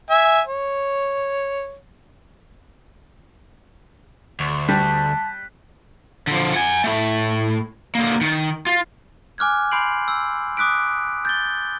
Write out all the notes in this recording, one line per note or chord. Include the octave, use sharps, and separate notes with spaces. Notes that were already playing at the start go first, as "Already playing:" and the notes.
E5 G#5
C#5
D2
G3 A5 F#6 B6
D3 F3
F#5 G#5
A2 A3
D3 A#3
D#3
F4
G#5 D6 F6 F#6 G#6
B5 C6 G6 C7 D7 F#7
E6
D6 D#6 F#6 B6 D7
G6 A6 G7